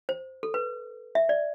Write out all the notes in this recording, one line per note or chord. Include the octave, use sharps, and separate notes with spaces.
C5
A4
B4
E5
D5